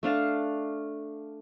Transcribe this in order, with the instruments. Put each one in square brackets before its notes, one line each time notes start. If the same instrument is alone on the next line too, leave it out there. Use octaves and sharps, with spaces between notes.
[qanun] A3 D4 F5 A5